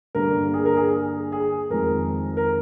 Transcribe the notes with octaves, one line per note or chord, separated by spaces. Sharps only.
G2 D3 G3 A#3 A#4
G#4
A#4
G#4
G#4
F2 D#3 G#3 C4 A#4
A#4